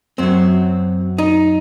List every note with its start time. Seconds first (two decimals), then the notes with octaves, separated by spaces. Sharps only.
0.18 F#2 F#3 C4
1.18 D#4